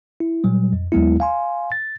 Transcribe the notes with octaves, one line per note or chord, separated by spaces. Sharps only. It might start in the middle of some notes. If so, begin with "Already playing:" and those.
E4
A#2 F#3 G3
F2
D#2 F#3 G#3 B3 E4
F5 G#5 C6
A6